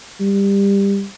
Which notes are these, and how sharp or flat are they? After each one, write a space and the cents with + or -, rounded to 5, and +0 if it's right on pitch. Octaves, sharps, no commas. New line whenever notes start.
G3 +20